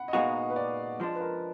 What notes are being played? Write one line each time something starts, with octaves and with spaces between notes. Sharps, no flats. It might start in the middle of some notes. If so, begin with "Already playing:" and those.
Already playing: F#5 B5
D#5
A#2 G#3 B3 D#4 F#4 F5
B4
D5
F3 G#3 D4
B4
A#4